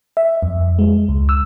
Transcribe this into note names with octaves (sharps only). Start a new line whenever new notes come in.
E5
F2
G#3
C#2
E6